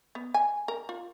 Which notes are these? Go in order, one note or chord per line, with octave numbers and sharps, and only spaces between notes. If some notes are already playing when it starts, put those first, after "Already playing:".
B3
G#5
A#4
F4